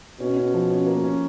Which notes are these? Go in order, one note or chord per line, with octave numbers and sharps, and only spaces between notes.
B2 C#4
C#4
F3
C#4
A#3
C#4